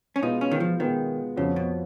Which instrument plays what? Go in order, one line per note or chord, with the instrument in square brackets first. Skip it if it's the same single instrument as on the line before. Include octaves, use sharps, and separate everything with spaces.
[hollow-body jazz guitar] C#4
[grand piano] B2 G#3 B3 F4 B4 [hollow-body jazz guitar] D#4
[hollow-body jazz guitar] C#4
D#3
F3
[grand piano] B2 G#3 B3 F4 B4 [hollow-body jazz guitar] D#3
[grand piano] F2 F3 B3 F#4 C#5 [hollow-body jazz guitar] C#3
[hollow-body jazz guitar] B2